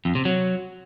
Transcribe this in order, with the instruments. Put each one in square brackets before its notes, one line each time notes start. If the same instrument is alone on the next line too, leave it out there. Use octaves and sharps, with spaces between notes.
[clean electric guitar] F2
C3
F#3